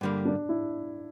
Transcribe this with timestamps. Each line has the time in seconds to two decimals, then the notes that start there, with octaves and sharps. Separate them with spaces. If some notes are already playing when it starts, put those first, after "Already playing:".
0.01 G2 D3 G3 A#3
0.25 D4
0.49 E4